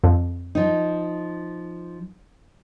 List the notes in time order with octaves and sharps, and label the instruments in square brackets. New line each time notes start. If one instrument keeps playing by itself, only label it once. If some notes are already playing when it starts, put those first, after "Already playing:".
[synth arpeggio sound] F2
[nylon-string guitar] F3 D#4